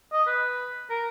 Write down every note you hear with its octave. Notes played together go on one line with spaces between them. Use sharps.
D#5
B4
A#4